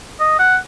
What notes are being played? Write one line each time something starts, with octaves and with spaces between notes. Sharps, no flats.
D#5
F#5